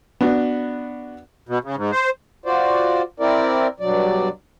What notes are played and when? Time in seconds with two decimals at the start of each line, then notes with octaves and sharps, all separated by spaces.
0.21 B3 D4 F#4
1.49 B2
1.64 C#3
1.76 G#2
1.92 C5
2.46 F4 F#4 C5 D5
3.20 C4 E4 A#4 D5
3.80 G2 B2 F#3 D5